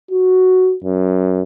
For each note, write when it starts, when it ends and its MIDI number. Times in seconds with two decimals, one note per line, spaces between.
0.11 0.75 66
0.84 1.41 42